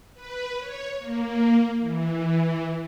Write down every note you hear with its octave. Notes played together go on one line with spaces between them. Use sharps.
B4
C#5
A#3
E3